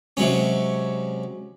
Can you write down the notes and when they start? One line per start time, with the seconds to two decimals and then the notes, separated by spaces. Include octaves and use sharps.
0.17 C3 F#3 G#3 C#4